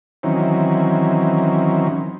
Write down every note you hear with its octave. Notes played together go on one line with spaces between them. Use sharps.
D#3 E3 F#3 C4 C#4